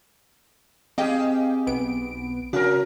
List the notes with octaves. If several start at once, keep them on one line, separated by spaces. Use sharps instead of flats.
C4 G4 G#4 D#5 F5 G5
B1 B3 D7
C#3 C#4 F#4 A#4